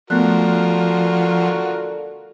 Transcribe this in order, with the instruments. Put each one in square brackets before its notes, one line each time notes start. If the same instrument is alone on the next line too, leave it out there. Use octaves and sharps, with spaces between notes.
[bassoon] D3 [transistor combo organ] F3 [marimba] A3 B3 F#6 [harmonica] F4 F#4 A#4